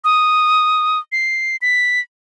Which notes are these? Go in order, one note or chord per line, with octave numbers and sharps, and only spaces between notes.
D#6
C7
B6